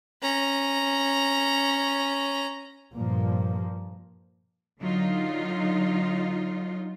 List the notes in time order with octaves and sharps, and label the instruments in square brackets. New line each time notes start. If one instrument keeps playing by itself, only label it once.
[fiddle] C#4 A#5
[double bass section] G2 A#2 F3 A#3
[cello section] D3 F#3 D#4 F4